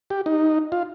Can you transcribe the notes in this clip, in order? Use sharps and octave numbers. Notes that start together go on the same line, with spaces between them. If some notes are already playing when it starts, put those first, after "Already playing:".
G4
D#4
F4